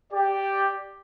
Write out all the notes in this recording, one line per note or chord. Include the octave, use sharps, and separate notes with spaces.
G4 D5